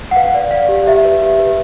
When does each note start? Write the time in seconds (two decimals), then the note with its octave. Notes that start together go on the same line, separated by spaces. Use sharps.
0.11 F#5
0.16 B4 F5
0.34 D5
0.51 D5 F5
0.69 G4
0.86 G4 E5
1.05 B4
1.22 G4
1.39 B4